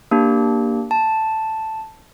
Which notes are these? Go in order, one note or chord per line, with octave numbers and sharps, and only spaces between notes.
A#3 D4 G4
A5